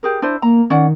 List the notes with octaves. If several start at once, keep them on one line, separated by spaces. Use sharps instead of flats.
G4 G#4 A#4
D4 E4 C5
A#3 A#5
D#3 C#4 D5 F#5